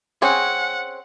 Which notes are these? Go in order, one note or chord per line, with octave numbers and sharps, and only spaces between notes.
C4 C#4 G#4 F#5